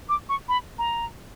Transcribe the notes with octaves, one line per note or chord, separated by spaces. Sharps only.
D6
C#6
B5
A#5